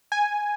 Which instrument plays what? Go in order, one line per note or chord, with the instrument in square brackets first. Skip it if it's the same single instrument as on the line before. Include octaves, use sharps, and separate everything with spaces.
[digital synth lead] G#5